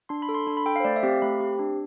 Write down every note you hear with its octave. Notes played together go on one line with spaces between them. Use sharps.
D4 C6
B5
A4
C6
D4
B5
A4 G5
F5
C5
A3 D5
E5
C4 G4
F5
A3 B5
C4 G4
D4